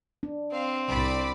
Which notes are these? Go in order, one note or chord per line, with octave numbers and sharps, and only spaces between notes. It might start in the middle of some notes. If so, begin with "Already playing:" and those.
D4
C4 F5
C2 D5 B5